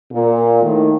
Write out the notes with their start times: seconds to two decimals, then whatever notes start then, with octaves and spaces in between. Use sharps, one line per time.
0.12 A#2
0.62 A2 D#3